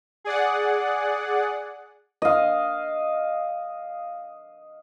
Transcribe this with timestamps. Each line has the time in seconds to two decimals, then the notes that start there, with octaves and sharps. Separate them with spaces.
0.24 G#4 D5 F#5
2.22 D#5 F5